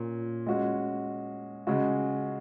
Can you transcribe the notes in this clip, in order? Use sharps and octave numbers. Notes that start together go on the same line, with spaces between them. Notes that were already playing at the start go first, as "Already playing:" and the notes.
Already playing: A#2 C#4
G#3 C#4 F#4
C#3 G#3 F#4